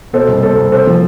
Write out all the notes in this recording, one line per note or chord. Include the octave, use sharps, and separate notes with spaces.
B2 A4 C5
C2
B2 A4 C5
C2
C3 A4 C5
F3